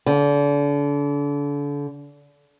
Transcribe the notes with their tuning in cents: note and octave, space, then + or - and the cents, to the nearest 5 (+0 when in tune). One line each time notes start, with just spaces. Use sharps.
D3 -35